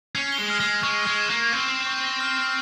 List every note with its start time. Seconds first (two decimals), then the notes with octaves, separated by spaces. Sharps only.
0.15 C#4 C7
0.32 G7
0.38 G#3
0.50 F6
0.60 G#3
0.67 F6
0.83 G#3 C#6
1.01 F6
1.07 G#3
1.18 E7
1.30 A#3
1.35 F6
1.53 C4 F6
1.69 C#6
1.87 C#6
2.03 A#6
2.21 F6
2.37 F6